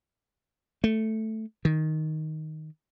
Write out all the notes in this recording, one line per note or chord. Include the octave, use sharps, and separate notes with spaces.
A3
D#3